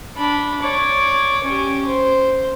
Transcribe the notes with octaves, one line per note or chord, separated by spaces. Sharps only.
D4 B5
C#5 D5
C#4 G4
C5